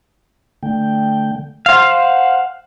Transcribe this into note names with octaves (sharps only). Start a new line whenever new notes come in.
D3 A3 G5
C5 F5 F#5